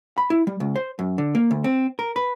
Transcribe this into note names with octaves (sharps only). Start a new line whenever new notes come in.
B5
E4
G3
C#2
C5
F#2
D3
A#3
D2
C4
A#4
B4